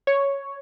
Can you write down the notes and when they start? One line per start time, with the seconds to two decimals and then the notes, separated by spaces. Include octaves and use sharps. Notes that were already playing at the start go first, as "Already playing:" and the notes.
0.07 C#5